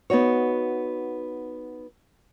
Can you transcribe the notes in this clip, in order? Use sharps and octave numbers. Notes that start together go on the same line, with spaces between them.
B3 D#4 F#4 C#5